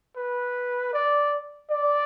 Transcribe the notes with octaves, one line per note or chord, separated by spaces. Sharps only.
B4
D5
D5